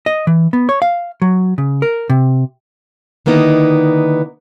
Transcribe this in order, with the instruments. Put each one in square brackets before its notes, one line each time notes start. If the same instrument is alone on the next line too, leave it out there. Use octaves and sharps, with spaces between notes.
[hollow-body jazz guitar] D#5
E3
B3
C#5
F5
F#3
C#3
A#4
C3
[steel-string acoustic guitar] D3 D#3 A#3 B3 D#4 E4